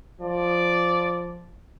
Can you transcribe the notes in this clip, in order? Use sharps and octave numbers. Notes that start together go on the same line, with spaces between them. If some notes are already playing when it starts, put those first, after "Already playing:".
F3 D5